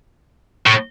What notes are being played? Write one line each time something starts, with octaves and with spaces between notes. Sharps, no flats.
A2